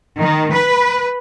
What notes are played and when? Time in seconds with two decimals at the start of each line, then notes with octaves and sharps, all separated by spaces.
0.22 D#3
0.54 B4